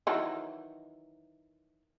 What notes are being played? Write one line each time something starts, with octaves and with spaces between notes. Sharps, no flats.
D#3 E3 F#3